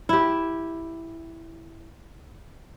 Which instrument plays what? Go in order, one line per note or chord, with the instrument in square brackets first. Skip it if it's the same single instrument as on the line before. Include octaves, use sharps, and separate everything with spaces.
[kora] E4 G4